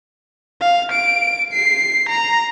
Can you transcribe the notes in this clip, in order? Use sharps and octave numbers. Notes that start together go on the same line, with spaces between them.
F5
D7
C7
A#5